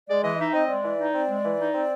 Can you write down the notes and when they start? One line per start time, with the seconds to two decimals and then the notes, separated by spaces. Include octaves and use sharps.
0.08 G#3 D5
0.23 E3 D#5
0.38 D#4 E5
0.53 C4 D#5
0.69 G#3 D5
0.83 E3
0.99 D#4
1.14 C4
1.29 G#3
1.44 E3
1.59 D#4
1.74 C4